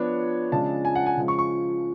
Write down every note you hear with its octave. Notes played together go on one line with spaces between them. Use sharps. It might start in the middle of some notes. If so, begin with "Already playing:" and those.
Already playing: F3 B3 D4 C#5
C#3 F3 G#3 D4 A5
G#5
F#5
G#5
C#3 F3 G#3
C#6
C#6